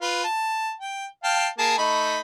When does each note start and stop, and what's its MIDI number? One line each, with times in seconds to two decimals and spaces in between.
0.01 0.24 65
0.01 0.24 71
0.24 0.72 81
0.80 1.06 79
1.24 1.48 77
1.24 1.48 79
1.24 1.48 81
1.59 1.76 58
1.59 1.76 68
1.59 1.76 81
1.78 2.19 57
1.78 2.19 63
1.78 2.19 83